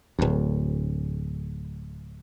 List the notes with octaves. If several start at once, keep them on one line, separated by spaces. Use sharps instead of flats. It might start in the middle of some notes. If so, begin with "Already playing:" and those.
D1 D2